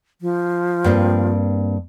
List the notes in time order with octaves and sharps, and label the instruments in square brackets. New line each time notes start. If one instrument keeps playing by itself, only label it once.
[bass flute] F3
[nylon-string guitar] G2 A#3 C4